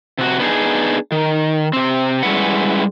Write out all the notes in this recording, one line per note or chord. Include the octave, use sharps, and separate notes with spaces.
C3 F#4
B3 D4 D#4 G#4
D#3
C3 C4
G3 G#3 C#4 E4 B4 F#5